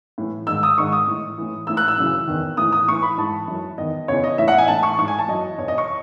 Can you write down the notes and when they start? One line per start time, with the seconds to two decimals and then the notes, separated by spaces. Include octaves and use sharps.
0.18 A2 E3
0.47 G#2 D#3 E6
0.63 D#6
0.78 G#2 D#3 C#6
0.93 D#6
1.07 A2 E3
1.38 A2 E3
1.67 A2 E3 E6
1.77 F#6
1.88 E6
1.97 F#2 C#3 E3
2.27 E2 D#3
2.57 A2 E3 D#6
2.72 D#6
2.88 A2 E3 C#6
3.02 B5
3.17 G#2 E3 A5
3.48 F#2 E3
3.78 E2 D#3 D#5
4.08 E2 C#3 E3 C#5
4.24 D#5
4.38 A2 E3 E5
4.48 F#5
4.58 G#5
4.68 A2 E3 A5
4.83 C#6
4.98 G#2 E3 C#6
5.08 G#5
5.19 A5
5.28 F#2 E3 D#5
5.58 E2 B2 C#5
5.68 D#5
5.78 C#6